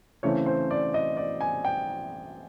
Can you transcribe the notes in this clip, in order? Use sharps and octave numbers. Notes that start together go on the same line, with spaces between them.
C#3 E3 A3 C4 C#5
C5
D5
D#5
D5
G#5
G5